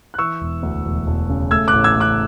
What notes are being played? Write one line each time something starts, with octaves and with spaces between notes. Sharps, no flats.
F#6
E3 C#6 E6
E1
D2
E1
E1
C#3
A3 E6 G#6
D6 F#6
A1
E6 G#6
A3
D6 F#6